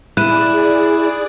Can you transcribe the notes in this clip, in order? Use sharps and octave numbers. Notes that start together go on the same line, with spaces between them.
E4 G#4 D5 F#6 D#7